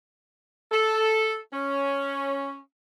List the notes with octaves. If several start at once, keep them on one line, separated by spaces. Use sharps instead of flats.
A4
C#4